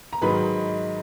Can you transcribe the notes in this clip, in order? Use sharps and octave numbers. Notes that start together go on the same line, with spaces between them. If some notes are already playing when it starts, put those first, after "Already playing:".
A#5
G#2 D#3 F#3 B4 B5